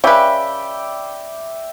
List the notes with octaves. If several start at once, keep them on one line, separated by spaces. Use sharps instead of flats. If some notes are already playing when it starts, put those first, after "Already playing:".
C#3 B4 D5 E5 G5